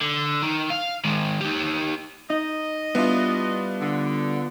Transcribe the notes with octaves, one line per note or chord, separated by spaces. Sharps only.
D3
D#3
F5
D#3 G#3
D#4 G4
D#4 D#5
G3 B3 D4 E4 F4
D3